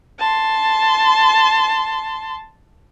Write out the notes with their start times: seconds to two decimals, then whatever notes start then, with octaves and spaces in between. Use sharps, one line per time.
0.19 A5 C6